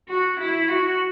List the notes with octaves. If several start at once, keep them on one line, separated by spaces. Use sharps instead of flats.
F#4
E4
F#4